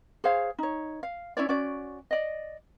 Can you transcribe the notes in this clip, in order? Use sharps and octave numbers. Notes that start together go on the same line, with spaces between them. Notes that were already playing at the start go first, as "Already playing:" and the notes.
G#4 C5 C#5 F5
D#4 C#5
F5
C#4 E4 C#5 D5
C#4 F#4 D5
D5 D#5